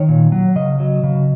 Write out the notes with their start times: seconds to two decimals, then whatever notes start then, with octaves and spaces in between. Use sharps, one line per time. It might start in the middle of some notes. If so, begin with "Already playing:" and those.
Already playing: D#3 C#5
0.09 A#2
0.32 F#3
0.56 C#3 D#5
0.80 F#3
1.03 C#3